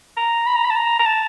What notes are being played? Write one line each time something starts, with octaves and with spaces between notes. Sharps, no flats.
A#5
B5
A#5
B5
A5
A#5
A#5
A5